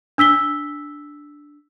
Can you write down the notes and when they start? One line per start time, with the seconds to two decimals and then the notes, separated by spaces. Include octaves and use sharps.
0.18 D4 E6 B6 G7